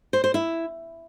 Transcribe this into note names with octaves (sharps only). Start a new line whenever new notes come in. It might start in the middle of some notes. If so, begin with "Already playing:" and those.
C5
C5
E4